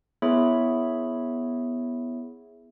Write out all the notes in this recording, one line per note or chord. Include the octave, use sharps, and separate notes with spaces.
B3 E4 G#4 C#5 E5 B5